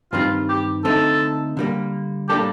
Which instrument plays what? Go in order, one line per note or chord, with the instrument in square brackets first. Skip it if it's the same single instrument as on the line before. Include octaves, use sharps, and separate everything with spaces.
[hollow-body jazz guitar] G2 D#3 G3 C4 [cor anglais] F4
[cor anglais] G4
[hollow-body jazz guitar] D3 A3 C4 D#4 [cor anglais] A4
[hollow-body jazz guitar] D3 G3 A#3
[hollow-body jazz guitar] A2 G3 A#3 D4 A4 [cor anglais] G4